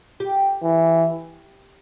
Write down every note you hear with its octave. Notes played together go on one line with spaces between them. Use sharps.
G4
E3